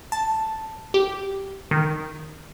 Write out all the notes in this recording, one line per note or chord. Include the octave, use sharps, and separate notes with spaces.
A5
G4
D#3